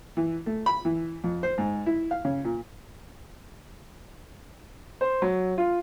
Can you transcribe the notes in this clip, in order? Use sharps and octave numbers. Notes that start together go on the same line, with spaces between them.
E3
A3
B5
E3
F2
C5
G#2
E4
F5
C#3
A#2
C5
F#3
F4